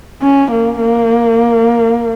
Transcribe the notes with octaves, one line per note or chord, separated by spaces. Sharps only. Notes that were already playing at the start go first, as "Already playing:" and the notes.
C#4
A#3
A#3